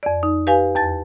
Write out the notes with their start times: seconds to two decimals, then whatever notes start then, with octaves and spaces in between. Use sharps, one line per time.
0.03 F2 D5
0.23 D#4
0.47 G4 B4 F5 G#5
0.75 E2 A5 A6